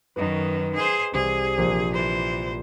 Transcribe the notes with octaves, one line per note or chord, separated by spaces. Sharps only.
F#2 D#3 B4 D#5
G#4 C5
C2 G#4
A#1 E7
E3 C5